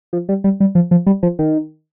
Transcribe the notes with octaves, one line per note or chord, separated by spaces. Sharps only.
F3
G3
G3
G3
F3
F3
G3
F3
D#3